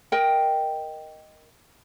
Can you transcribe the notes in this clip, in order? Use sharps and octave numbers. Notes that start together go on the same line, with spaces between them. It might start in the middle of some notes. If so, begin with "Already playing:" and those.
A#4 D#5 G5